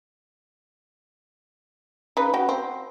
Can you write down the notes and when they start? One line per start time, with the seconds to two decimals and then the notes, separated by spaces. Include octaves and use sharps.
2.17 C#3 D#4 B4
2.34 F#4 G5
2.49 C4